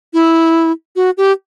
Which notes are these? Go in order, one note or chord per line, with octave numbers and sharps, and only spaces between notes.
E4
F#4
G4